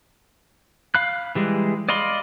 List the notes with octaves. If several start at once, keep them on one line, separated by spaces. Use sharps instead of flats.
F5 B5 F#6
E3 G3 G#3
D5 D#5 F5 B5 C6